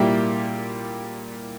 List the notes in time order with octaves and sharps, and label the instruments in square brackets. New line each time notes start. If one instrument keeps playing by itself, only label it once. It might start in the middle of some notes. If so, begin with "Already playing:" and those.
Already playing: [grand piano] A#2 G3 A#3 E4 G4